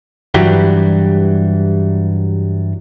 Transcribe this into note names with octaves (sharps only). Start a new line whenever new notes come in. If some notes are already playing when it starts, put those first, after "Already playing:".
G2 E3 F#3 G3